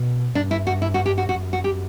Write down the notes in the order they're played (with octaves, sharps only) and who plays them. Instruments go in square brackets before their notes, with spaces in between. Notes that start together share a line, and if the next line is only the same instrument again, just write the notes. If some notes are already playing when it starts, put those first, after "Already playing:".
Already playing: [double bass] B2
[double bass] G2 [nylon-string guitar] D4
[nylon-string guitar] E4
F#4
E4
F#4
G4
F#4
[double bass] F#2 [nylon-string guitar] F#4
[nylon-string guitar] F#4
G4